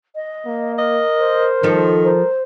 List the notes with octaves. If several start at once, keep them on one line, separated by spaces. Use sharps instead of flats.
D#5
A#3
A#4 D#5
C5
D#3 F3 A4
A#4 C5